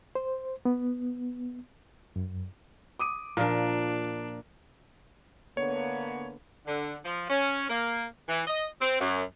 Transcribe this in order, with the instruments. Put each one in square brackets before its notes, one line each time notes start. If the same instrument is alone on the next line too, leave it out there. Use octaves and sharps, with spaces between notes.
[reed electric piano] C5
B3
F#2
[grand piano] D6 D#6 D#7
[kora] A#2 F3 [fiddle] D4 [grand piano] A#4 A#5
[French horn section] D3 A#3 B3 [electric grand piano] C#5
[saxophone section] D3
F3
C#4
A#3
E3
D#5
C4
F#2